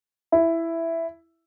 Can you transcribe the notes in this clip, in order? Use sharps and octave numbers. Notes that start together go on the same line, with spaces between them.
E4